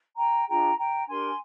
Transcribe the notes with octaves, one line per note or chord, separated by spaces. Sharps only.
G5 A#5
D4 F4 G#4 G5 A#5
G5 A#5
D4 G4 A#4 G#5 C6